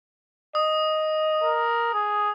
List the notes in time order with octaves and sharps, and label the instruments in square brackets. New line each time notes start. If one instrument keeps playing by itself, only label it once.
[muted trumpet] D#5 [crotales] D#6
[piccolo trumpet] A#4
G#4